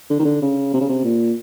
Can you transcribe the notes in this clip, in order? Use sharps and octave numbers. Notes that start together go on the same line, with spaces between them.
D3
D#3
D3
C#3
C3
C#3
C3
A#2